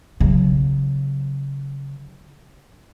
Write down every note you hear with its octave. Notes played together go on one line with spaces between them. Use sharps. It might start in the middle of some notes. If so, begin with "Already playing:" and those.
C#3 F#3